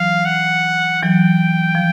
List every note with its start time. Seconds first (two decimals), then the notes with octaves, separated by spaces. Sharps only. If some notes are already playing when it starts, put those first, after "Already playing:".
Already playing: E3 F#3 F5
0.25 F#5
1.03 E3 F#3 G5
1.75 F3